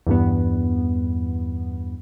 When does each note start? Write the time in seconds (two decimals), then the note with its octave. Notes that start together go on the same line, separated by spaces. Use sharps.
0.07 E2 G2 B3